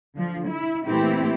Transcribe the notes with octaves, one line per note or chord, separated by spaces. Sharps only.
D3 F3
E4
A#2 E3 A3 C4 E4 G4